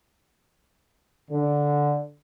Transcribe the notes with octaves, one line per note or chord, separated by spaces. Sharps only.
D3